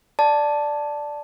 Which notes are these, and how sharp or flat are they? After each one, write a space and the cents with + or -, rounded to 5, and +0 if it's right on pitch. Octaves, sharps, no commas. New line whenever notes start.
D5 +0 A5 +0